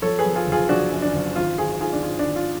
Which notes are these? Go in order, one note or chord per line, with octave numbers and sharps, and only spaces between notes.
F3 A4 C#5
G#4 B4
F3
F4 G#4
F#1
F4 G#4
F3 D4 F#4
F#2
D4
F#1
G#1 F4
G#1 F4 G#4
G#2 F4 G#4
D4
G#1 F4
D4
G#1
F4